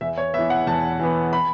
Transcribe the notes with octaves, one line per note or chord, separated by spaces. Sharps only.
E2 E5
C#5
E3 B3 E5
F#5
E2 A5
E3 B3
B5